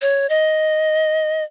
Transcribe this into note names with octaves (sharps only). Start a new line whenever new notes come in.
C#5
D#5